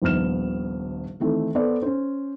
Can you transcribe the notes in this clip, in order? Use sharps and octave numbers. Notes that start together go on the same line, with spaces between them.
D#1 A#1 D#2 B3 F6 E7
D#3 E3 A3 C4
B3 A4 C5 D5
C#4 C5